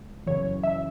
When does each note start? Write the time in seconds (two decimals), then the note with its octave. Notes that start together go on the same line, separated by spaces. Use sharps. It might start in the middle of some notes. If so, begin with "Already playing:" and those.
Already playing: C#2
0.27 F#2 C#3 E3 C#5
0.63 E5